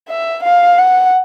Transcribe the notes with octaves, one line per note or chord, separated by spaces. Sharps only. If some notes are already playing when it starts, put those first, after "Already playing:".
E5
F5
F#5